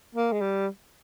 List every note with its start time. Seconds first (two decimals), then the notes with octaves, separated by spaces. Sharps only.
0.15 A#3
0.32 G#3
0.41 G3